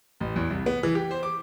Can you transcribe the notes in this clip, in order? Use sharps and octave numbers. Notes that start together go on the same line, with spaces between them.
A1
E2
C2
B3
E3
G4
C5
D6